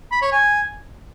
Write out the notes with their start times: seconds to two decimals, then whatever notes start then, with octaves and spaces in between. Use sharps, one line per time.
0.12 B5
0.22 C#5
0.32 G#5